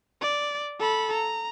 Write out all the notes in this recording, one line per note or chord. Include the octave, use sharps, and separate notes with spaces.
D5
A4 B5
A#5